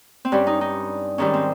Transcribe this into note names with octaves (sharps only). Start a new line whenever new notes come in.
C4
G2 G3 C#4
D#4
D#4
G#2 D#3 G3 C#4
C4